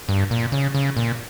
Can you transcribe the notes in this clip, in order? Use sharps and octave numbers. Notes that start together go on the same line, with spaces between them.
G2
A#2
C#3
C#3
A#2